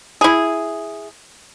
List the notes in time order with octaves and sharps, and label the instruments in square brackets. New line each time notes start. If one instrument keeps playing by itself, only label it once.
[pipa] E4 G#4